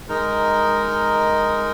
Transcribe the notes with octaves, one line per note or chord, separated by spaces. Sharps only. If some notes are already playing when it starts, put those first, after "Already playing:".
G#3 D#4 A#4 D#5